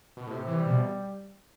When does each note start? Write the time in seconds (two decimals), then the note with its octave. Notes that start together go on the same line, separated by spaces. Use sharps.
0.17 B2
0.27 A2 C3
0.47 E3
0.57 G3
0.66 B2